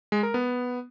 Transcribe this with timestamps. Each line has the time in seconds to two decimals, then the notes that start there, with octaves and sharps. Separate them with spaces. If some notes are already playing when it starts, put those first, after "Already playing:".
0.12 G#3
0.23 A#4
0.34 B3